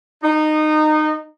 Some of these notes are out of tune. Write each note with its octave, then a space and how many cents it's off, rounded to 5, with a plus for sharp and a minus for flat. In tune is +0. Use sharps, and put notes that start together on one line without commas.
D#4 -20